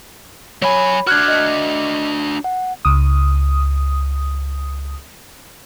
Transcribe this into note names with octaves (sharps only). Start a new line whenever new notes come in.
F#3 C#5 G#5 B5
D4 F#4 F6 F#6 G#6
D#5
F#5
C#2 D#6